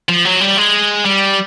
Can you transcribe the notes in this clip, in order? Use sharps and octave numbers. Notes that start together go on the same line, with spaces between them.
F3
F#3
G3
G#3
G3